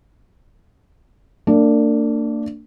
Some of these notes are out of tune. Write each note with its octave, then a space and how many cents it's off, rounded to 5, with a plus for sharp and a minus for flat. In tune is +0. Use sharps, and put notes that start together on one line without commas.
A#3 -40 D4 +0